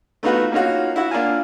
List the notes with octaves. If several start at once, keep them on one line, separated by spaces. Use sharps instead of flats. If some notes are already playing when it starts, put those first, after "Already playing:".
A3 B3 D#4 F4 F#4 B4
A#3 C#4 D#4 F4 F#4
E4 F#4
A#3 D4 F4 A#4 F5 G#5